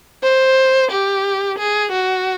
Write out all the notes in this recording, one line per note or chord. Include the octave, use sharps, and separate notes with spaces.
C5
G4
G#4
F#4